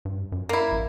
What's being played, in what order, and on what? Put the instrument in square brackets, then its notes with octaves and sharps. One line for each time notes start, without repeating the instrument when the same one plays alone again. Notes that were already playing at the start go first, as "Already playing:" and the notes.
[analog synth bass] G2
F#2
[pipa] A#3 E4
[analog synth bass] A1